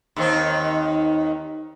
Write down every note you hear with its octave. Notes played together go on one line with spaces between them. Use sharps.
D#2 D#3 C4